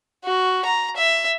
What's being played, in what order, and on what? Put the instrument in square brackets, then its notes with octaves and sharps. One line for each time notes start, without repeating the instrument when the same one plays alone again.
[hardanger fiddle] F#4
A#5
E5